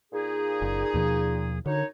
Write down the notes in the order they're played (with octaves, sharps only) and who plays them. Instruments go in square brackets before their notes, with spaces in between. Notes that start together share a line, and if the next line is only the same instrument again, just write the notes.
[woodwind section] A#2 D#4 G#4
[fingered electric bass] F#1
D#2 B2 F3
[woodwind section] F#2 D#4 C#5 [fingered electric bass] D3